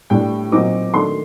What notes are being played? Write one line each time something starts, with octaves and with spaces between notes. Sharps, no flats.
A2 G3 D4 G5
A#2 F#3 C4 D#4 D6
D#3 A3 D4 C6